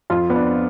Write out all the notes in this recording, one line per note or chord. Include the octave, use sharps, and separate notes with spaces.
F2 F4
B3
D4